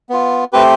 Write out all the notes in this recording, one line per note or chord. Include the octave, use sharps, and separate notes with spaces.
B3 F4
A3 C4 G4 B4